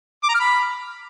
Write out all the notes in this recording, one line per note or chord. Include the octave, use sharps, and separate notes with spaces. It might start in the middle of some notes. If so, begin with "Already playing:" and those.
D6
A#5
F6
B5